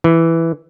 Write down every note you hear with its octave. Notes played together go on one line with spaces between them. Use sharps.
E3